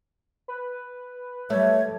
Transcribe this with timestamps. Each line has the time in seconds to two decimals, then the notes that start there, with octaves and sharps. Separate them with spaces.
0.48 B4
1.50 G3 A3 C#5